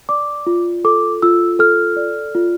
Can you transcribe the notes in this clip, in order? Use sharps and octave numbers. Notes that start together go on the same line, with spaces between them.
D5 D6
F4
A4 D6
F4 E6
A4 F6
D5
F4